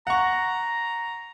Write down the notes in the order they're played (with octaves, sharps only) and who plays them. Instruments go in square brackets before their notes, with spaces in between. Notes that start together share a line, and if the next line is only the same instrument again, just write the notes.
[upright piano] F#5 C#6 [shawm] A#5